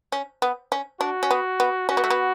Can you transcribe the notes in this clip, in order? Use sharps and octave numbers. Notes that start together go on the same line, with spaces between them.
C#4
B3
C#4
D4 F#4
C#4
B3
B3
C#4 F#4
B3
A3
B3